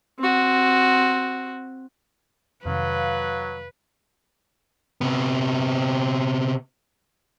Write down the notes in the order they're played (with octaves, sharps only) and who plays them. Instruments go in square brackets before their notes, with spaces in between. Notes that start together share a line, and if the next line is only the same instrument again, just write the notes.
[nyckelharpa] C4 F#4
[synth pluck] F2 C3 D#3 [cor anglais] F#3 [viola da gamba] B4 [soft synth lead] F5
[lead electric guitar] C3 B3